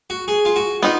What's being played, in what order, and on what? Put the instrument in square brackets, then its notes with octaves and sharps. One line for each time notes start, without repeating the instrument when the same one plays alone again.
[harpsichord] F#4
G#4
F4
F#4
[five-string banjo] B3 D#4 [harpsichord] F4